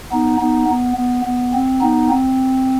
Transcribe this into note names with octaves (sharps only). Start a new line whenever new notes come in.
B3 D#4
B3 D#4
B3
B3
B3
C4
B3 D#4
C4